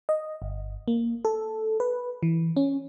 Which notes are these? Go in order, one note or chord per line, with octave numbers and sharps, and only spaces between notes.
D#5
G1
A#3
A4
B4
E3
C#4